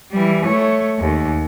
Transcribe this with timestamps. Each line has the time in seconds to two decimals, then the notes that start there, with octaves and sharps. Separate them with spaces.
0.12 E3 G3
0.46 A3 C#5
0.99 D#2